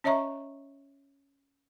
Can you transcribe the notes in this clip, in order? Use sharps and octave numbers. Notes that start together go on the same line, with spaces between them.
C#4 C#5 D#5 E5 A#5 C#6